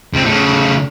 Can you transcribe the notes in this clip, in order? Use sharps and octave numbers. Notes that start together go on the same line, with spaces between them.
C#2 C4
C#3 A3